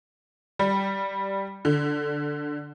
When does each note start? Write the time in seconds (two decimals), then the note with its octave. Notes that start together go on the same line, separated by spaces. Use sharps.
0.59 G3
1.65 D3